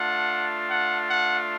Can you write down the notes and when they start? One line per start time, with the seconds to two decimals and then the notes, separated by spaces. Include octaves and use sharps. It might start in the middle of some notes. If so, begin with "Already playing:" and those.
Already playing: A3 D4 F4 F#5
0.69 F#5
1.09 F#5